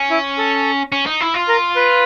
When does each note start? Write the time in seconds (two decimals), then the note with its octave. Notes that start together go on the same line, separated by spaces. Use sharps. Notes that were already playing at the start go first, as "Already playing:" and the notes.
Already playing: C#4
0.10 E4
0.38 A4
0.92 C#4
1.06 D#4
1.20 E4
1.34 F4
1.48 A#4
1.76 B4